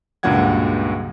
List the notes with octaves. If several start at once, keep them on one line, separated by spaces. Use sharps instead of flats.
C#2 G2 A#2 F#3 F#5 G#6